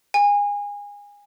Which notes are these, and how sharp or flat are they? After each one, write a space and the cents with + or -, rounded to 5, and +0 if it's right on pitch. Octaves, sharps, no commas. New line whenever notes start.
G#5 -25